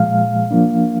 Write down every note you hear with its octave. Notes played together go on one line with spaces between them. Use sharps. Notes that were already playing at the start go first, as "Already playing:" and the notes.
Already playing: A#2 F3 G#3 F5
F3 A#3 D4